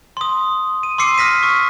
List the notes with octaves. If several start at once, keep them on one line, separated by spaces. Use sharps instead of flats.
C6 D#6
D#7
C6 D6 E6 C7 C#7 D#7
D#6 F6 A#6 B6 D#7
C#6